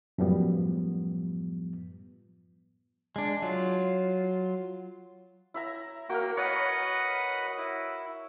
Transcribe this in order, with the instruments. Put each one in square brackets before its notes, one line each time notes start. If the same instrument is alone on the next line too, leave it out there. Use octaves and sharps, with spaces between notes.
[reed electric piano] F#2 A2 F3 G3 B3
[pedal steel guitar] G#3 D4
F#3 F4
[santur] E4 E5 A#5
[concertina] A#3 G5 [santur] F#4 A#4
[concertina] B4 D#5 F#5 [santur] C#5
[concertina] E4